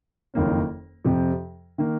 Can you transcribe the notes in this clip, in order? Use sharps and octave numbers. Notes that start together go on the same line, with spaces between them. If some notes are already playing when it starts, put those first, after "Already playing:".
F#1 F2 D#3 A#3 C#4
F2 C3 F3
D#3 A#3